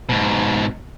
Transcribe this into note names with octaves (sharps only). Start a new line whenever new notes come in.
G#2 B2